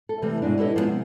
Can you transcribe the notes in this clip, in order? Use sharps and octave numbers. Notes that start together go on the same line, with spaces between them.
A4
C3 E3 G3 A3
G#2 B2 G#3 D4
E4 G4 A4 B4 C#5 D#5
F3 G3 G#3 B3 C#4
C3 B3